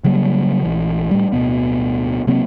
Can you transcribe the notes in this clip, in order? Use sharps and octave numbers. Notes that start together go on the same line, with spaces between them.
C#3 F#3 G3 A#3
A#1 E3
A2 G3
D1 G1 B2 B3
C3 F#3 A#3 C4